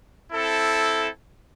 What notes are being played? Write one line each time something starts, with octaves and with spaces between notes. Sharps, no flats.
C4 E4 A4